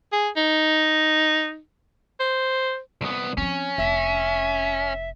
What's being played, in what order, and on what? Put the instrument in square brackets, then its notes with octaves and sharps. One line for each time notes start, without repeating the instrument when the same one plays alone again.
[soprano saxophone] G#4
D#4
C5
[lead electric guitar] C2 B3
[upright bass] F3 C4 [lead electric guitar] C#4
[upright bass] F1 [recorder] E5